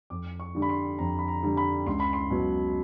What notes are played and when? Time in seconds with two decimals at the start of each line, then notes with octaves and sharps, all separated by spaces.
0.10 F2 D6
0.40 C#6
0.55 D3 G3
0.62 B5
0.69 C6
0.99 F2 A#5
1.19 B5
1.28 A#5
1.43 D3 G3
1.57 B5
1.86 C#2 C6
2.00 B5
2.13 C6
2.30 B2 F#3